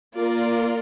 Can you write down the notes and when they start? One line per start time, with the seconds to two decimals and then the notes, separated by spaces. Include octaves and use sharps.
0.16 A#3 F4 A#4 D5